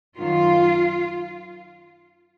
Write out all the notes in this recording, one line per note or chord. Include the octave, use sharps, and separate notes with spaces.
F#2 D#3 F#3 F4